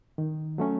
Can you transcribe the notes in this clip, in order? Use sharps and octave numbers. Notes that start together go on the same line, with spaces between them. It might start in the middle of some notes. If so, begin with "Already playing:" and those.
D#3
F#3 A3 C#4